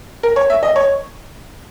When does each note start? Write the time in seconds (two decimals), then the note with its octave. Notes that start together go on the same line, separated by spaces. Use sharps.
0.23 A#4
0.36 C#5
0.50 E5
0.63 D#5
0.76 C#5